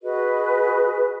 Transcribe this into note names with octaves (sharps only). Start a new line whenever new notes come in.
F#4 G#4 B4 D#5